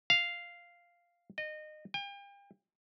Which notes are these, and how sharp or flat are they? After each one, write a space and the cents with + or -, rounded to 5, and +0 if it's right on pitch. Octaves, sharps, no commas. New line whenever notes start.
F5 -5
D#5 -25
G5 +40